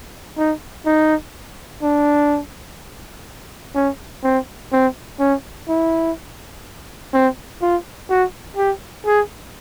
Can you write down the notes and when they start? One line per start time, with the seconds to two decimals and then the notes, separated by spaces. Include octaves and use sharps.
0.38 D#4
0.86 D#4
1.82 D4
3.75 C#4
4.24 C4
4.73 C4
5.20 C#4
5.68 E4
7.13 C4
7.62 F4
8.10 F#4
8.57 G4
9.07 G#4